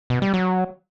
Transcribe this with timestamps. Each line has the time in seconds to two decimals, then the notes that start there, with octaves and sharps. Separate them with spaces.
0.10 B2
0.22 G3
0.34 F#3